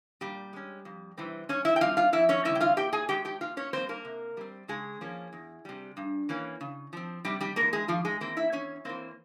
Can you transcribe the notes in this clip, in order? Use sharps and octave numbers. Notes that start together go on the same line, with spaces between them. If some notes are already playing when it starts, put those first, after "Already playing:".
A#2 G3 G4
G#3 C#4
F2
C3 E3 G3 C4
G2 C#4 C#5
E4 E5
G5
G3 C4 F4 F5
F4 F5
F2 E4 E5
C#4 C#5
C#3 E3 G3 C#4 E4 E5
G5
F4 F5
A#2 G4 G5
G#4 G#5
G#3 C#4 G4 G5
G4 G5
A#2 F4 F5
C#4 C#5
G3 A#3 C4 C5
A#3 A#4
C3
G3 C4
C#3 G#3 G#4
F3 A#3 C#4
E2
C3 G3
G2
E3 A#3 C#4
C#3
F3 C4
C3 G3 G4
G3 G4
E3 G#3 A#3 A#4
G#3 G#4
G#2 F3 F4
G#3 G#4
E3 A#3 C4 C5
E4 E5
E2 C#4 C#5
E3 A#3 C4 C5